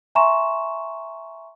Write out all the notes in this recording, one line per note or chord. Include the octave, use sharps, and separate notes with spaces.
E5 G#5 A#5 C6 C#6 E7